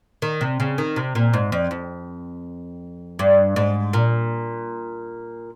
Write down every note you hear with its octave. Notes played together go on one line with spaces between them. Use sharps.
D#3
C3
C#3
D#3
C3
A#2
G#2
F2
F2
G2
G#2
A#2